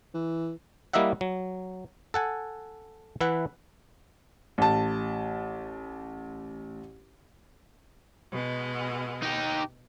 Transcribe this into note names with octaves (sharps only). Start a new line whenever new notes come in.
E3
G3 A#3 E4 D#5 E5 F#5
F#3
A4 F#5 G#5
E3 E4 B4 F#5
A1 A5
B2 G#3
D#4 G4